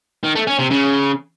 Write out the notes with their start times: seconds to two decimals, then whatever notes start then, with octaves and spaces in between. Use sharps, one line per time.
0.24 D#3
0.35 A3
0.47 C#4
0.59 C3
0.70 C#3